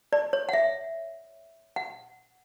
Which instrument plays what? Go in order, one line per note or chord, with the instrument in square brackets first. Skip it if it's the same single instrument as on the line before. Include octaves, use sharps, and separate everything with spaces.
[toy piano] D5
C#5
F#5
E5
F#5